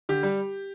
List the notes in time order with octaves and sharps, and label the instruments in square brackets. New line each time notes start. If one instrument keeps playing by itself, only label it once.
[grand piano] D3 G4
G3